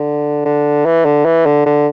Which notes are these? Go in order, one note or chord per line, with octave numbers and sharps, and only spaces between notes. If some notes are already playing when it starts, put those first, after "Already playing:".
Already playing: D3
D3
E3
D3
E3
D3
D3